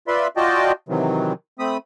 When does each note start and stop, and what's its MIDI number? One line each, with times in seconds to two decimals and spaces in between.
0.08 0.27 65
0.08 0.27 71
0.08 0.27 74
0.08 0.27 76
0.08 0.27 83
0.08 0.27 84
0.37 0.72 65
0.37 0.72 66
0.37 0.72 74
0.37 0.72 75
0.37 0.72 79
0.37 0.72 81
0.89 1.33 48
0.89 1.33 51
0.89 1.33 52
0.89 1.33 54
1.59 1.77 57
1.59 1.77 60
1.59 1.77 83
1.59 1.77 87